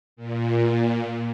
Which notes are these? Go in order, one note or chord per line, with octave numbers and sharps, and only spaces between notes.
A#2